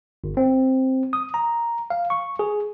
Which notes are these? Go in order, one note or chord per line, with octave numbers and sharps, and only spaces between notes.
G1
C4
D#6
A#5
F5
C#6
G#4